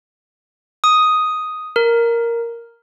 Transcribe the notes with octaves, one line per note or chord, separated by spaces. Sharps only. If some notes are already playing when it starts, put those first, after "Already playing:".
D#6
A#4